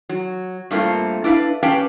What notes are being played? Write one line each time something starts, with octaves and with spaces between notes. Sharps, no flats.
F#3
G2 A3 A#3 C4 F4
D4 E4 B4 F5
C#4 G4 B4 F5 G5 A5